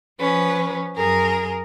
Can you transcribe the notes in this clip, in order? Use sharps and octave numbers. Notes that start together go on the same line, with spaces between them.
F3 C#4 B4
F#2 G#4 A#4